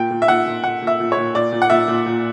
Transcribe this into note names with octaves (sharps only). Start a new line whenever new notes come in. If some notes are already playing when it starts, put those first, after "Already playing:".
Already playing: A#2 G5
A#2
E5
A#2 F#5
A#2
A#2 F#5
A#2 E5
A#2
C#5
A#2
A#2 D5
A#2
F#5
A#2 E5
A#2
A#2